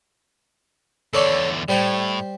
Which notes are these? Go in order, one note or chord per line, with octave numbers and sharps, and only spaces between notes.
E2 D3 A4 C#5 D5
A2 G3 C5 G5